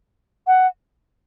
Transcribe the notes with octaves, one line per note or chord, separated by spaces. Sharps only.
F#5